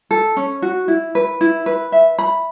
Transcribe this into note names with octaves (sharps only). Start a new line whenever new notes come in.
A4
C#4
F#4
E4
B4
E4
B4
E5
B5